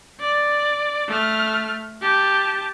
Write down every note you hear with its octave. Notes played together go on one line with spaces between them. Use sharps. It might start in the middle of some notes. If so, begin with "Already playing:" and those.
D5
A3 F6
G4 A5